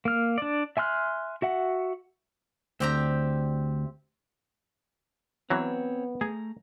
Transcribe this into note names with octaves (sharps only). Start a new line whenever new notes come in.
A#3 F6
D4 D5
E5 G#5 C6 F6 F#6
F#4 E5 F#5
D2 C4 G4 A#5
E3 F#3 B3 C4 C#5 F#5
A3 G#4 A#5